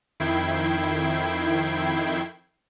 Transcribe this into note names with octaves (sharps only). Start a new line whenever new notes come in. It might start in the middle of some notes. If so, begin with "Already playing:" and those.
F2 D#3 E4 G5 G#6 C7